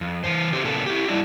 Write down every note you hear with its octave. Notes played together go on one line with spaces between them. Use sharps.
F2
E3 C5
D3 G4 C5
A#2 C#3 B3 A4
E4 G4
G3 D4 E4